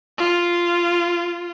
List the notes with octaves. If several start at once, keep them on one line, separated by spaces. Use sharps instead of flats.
F4